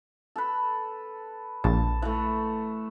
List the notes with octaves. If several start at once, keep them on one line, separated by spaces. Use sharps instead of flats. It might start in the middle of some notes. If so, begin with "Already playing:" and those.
A4 B4
A#1 A5
E3 A3